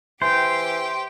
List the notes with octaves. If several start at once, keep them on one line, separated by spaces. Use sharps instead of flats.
E3 G4 C5 G5